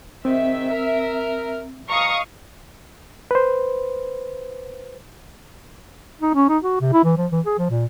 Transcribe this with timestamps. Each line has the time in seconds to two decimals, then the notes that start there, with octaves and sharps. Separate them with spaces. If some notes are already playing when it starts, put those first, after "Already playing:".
0.25 G#2 D#3 C4 E5
0.70 A#4
1.89 F3 G3 D#5 F5 A#5 C#6 D#6
3.31 B4 C5
6.21 D#4
6.35 C#4
6.49 D#4
6.63 F#4
6.81 C3
6.93 E4
7.04 E3
7.17 F3
7.32 E3
7.46 G#4
7.58 F3
7.70 A#2